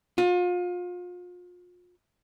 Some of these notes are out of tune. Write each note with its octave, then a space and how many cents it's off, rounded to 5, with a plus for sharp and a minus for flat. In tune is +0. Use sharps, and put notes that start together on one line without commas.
F4 +35